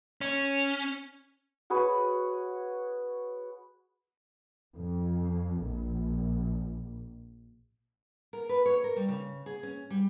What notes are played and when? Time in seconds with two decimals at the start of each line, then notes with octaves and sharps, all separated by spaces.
0.21 C#4
1.70 F#4 G#4 B4 C#5
4.75 F2
5.63 A#1
8.33 A#4
8.49 B4
8.66 C#5
8.84 A#4
8.96 G3
9.09 C#3
9.46 G#4
9.63 C#4
9.90 G3